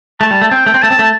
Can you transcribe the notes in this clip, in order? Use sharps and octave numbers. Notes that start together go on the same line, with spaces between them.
A3 A5
G3
A3
C4 G5
A3
C4
A3 A5
C4
A3